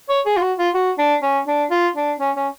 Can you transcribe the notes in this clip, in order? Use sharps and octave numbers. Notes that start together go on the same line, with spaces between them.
C#5
G#4
F4
F#4
F4
F#4
D4
C#4
D4
F4
D4
C#4
C#4